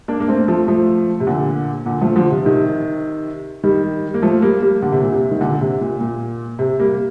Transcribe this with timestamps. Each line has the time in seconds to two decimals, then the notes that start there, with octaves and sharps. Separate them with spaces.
0.08 A#3 D4
0.20 A#3
0.28 A3 C4
0.48 F3 A3
0.68 F3 A3
1.20 C3
1.27 A#2 D3
1.86 A#2 D3
2.01 F3 A3
2.15 D3 F3
2.30 C3
2.45 C3 D#3
3.64 D#3 G3
4.14 A#3
4.22 F3 A3
4.42 G3 A#3
4.62 G3 A#3
4.82 D3
4.92 C3
5.02 A#2
5.12 C3
5.31 D#3
5.41 A#2 D3
5.61 C3
5.81 A#2
6.01 A#2
6.59 C3
6.79 G3 A#3